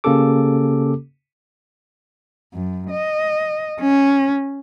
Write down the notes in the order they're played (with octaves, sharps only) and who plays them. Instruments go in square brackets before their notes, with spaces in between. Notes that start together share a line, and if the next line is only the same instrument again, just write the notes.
[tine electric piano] C#3 A#3 C#4 G4 A4 D6
[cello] F#2
D#5
C#4